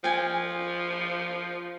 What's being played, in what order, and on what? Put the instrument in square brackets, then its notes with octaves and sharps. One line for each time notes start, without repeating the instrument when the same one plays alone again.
[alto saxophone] F3 [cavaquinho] G5 G#5